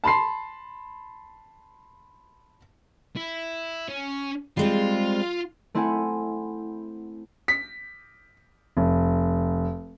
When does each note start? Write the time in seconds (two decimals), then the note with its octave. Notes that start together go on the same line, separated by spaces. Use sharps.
0.04 A5 B5 C6 C7
3.16 E4
3.88 C#4
4.57 G3 G#3 C4 F4
5.74 A3 C4 E4 F#5 G#5
7.48 B6
8.77 F1